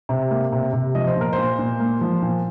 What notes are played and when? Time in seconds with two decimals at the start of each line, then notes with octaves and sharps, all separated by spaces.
0.09 C3
0.31 A#3
0.52 C3
0.73 C3
0.95 F3 D#5
1.07 C5
1.16 A#2 A#4
1.33 C5
1.38 A#2
1.59 A#2
1.80 A#3
2.01 F3
2.22 A#2